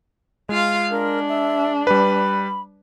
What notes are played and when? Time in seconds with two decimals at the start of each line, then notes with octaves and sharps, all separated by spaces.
0.49 G#3 F4 F5
0.91 D4 A#4
1.29 E5
1.87 G3 B4 B5